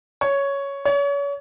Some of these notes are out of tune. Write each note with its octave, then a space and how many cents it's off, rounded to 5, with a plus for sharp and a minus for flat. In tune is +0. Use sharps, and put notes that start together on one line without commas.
C#5 +5
C#5 +35